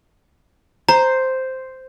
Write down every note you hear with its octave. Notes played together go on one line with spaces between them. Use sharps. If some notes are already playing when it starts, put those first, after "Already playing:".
C5 A#5